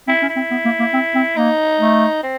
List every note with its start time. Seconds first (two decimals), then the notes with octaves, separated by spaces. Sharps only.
0.08 C4 E4
0.22 C#4
0.29 E4
0.36 C4
0.51 B3
0.65 A#3
0.80 A#3
0.93 C4
1.15 C4
1.37 A#3 D#4
1.80 A3
2.23 C4